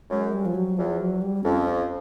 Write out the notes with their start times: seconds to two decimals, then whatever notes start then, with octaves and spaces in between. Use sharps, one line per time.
0.11 F#2 G#3
0.33 G3
0.46 F3
0.55 F#3
0.78 E2 F3
1.00 F#3
1.22 G3
1.44 F2 C#4